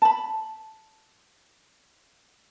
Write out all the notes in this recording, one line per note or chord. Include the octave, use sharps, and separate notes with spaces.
A5 B5